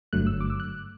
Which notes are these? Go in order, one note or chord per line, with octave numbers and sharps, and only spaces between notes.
G1 G2 D3 F#3 A3 F#6
E6
D6
E6
F#6